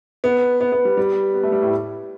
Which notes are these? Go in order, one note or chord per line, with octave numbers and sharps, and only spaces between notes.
B3
B3
B3
G3
G3
B3
A3
G3
A2